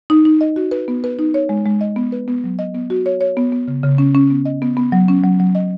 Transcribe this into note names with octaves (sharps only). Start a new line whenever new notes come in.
D#4
D#4
D#5
F#4
B4
B3
B4
D#4
C#5
G#3
G#3
D#5
B3
B4
B3
F#3
D#5
B3
F#4
C#5
C#5
B3
B3
C#3
C#3
C#4
C#4
B3
D#5
B3
B3
F#3
C#4
F#3
F#3
D#5